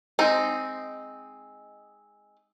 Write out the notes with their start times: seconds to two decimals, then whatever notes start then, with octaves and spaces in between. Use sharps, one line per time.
0.19 G#3 C4 D#4